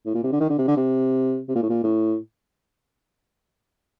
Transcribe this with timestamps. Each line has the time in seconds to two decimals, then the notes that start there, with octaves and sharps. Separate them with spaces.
0.06 A2
0.14 A#2
0.23 C3
0.32 D3
0.40 D#3
0.50 D3
0.59 C3
0.68 D3
0.77 C3
1.49 C3
1.55 A#2
1.63 A2
1.70 A#2
1.84 A2